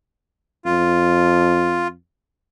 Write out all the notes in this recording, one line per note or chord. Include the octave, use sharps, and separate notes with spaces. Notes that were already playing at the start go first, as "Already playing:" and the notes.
F2 F4